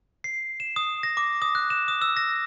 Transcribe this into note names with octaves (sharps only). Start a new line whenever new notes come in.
C7
E7
D#6
A#6
D6
D#6
F#6
E7
D#6
E6
A#6